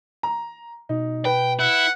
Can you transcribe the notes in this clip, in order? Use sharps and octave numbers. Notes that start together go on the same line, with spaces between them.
A#5
B2 D#4
B4 G5
E4 F#5